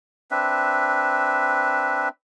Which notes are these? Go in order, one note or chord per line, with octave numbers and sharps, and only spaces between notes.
C4 D4 B4 E5